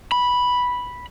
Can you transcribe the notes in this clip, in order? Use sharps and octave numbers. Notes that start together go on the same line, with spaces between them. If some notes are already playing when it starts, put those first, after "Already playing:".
B5